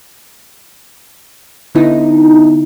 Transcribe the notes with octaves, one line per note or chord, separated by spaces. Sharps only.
D3 B3 D#4 E4